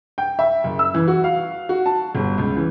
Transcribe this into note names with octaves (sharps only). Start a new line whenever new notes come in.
G5
E5
F#1
E6
E3
F#4
F5
F#4
A5
G1
C#2
E3